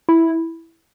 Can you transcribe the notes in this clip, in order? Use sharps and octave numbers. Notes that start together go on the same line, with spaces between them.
E4